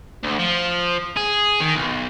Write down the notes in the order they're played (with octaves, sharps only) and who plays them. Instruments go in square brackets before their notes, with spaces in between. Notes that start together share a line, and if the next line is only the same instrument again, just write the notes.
[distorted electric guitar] D2
F3
G#4
D#3
B1